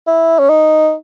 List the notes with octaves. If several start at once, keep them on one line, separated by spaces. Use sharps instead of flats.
E4
C#4
D#4